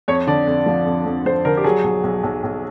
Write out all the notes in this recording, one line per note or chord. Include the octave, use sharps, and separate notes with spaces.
F2 C#5
D3 D5
F2
F3
F2
F2
F2 C5
D3 A#4
G4
F#3 G#4
B1
B1
B1
B1